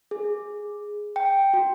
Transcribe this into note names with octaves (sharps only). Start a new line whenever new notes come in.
G#4
G5
F#4